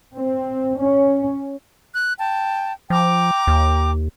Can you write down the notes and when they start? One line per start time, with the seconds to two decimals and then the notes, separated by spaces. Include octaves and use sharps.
0.15 C4
0.80 C#4
1.93 F#6
2.19 G5 A5
2.90 F3 G5 A#5 D6
3.47 D#2